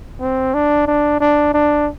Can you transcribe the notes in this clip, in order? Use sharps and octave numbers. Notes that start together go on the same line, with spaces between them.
C4
D4
D4
D4
D4